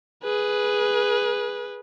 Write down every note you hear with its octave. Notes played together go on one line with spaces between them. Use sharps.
G#4 B4